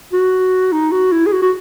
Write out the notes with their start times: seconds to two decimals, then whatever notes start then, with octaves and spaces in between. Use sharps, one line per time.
0.13 F#4
0.72 D#4
0.91 F#4
1.12 E4
1.26 G#4
1.32 F#4
1.42 F#4